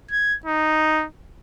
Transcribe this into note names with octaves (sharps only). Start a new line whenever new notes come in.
G#6
D#4